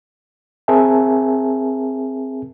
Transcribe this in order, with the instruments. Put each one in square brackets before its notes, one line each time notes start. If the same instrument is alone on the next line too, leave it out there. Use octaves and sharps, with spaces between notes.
[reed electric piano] C4 G#4 A#4 E5 G#5 A5